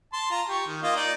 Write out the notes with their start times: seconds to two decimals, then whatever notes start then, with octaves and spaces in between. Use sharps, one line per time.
0.13 A5 C6
0.31 F4 A#5
0.49 G4 C#6
0.66 D#3
0.83 A#3 F4 D#5
0.96 D#4 D5